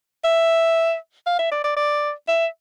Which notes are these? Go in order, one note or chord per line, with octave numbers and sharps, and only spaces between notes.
E5
F5
E5
D5
D5
D5
E5